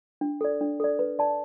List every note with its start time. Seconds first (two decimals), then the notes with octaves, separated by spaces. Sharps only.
0.21 D4
0.41 A4 D5
0.61 D4
0.80 A4 D5
0.99 B4
1.19 D5 A5